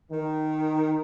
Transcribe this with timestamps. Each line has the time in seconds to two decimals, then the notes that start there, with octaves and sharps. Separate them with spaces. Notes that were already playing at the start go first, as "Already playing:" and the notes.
0.11 D#3